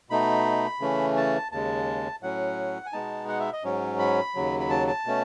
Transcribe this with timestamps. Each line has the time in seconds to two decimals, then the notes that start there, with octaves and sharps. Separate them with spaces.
0.10 B2 A3 D#4 B5
0.80 C#3 E3 A3 C#4
1.17 A5
1.51 D#2 C#3 G#3 A5
2.23 A2 F#3 C#4 F#5
2.86 G#5
2.93 B2 G#3 B3 D#4 A5
3.28 F#5
3.40 E5
3.53 D#5
3.64 G#2 F#3 C#4
3.99 B5
4.35 D#2 C#3 F#3
4.60 B5
4.70 A5
4.87 A5
5.06 B2 A3 C#4